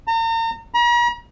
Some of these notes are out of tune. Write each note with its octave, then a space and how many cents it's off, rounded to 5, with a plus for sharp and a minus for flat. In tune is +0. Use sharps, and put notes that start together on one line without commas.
A#5 -40
A#5 +45